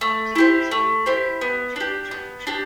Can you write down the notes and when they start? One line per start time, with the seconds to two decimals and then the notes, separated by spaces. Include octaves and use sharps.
0.01 A3
0.35 E4 G4 C5
0.71 A3
1.06 E4 G4 C5
1.41 B3
1.76 D4 G4
2.11 B3
2.47 D4 G4